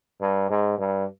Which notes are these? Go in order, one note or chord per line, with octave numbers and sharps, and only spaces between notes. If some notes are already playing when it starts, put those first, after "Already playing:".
G2
G#2
G2